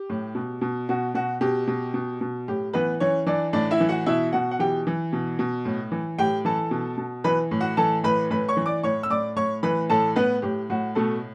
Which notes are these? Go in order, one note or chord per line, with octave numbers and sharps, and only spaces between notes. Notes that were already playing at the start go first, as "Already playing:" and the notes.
Already playing: G4
A2
B2
B2
B2 F#4
B2 F#4
B2 G4
B2
B2
B2
A2 G4
E3 B3 B4
E3 C#4 C#5
E3 D4 D5
A2 D4 D5
E4 E5
E3
F#4 F#5
B2 E4 E5
B2 F#4 F#5
F#5
E3 G4 G5
E3
B2
B2
A2
E3
A2 G4 G5
E3 A4 A5
B2
B2
E3 B4 B5
A2
F#4 F#5
E3 A4 A5
A2 B4 B5
A2 B4 B5
C#5 C#6
E3
D5 D6
A2 C#5 C#6
E6
A2 D5 D6
A2 C#5 C#6
E3 B4 B5
A2 A4 A5
A2 B3 B4
A2 G4
A2 F#4
B2 A3 A4